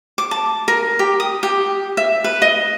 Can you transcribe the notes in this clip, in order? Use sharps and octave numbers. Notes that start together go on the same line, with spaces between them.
D6
A5
A#4
G4
D#6
G4
E5
B4
D#5